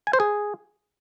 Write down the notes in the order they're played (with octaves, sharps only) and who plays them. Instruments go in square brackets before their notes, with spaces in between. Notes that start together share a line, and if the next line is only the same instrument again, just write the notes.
[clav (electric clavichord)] G#5
C5
G#4